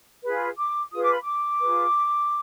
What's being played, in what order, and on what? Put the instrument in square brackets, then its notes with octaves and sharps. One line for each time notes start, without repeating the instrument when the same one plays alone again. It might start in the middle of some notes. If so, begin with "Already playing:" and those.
[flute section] F4 G#4 B4
D6
F4 G#4 B4 D#6
D6
B5
D6
F4 G#4 B4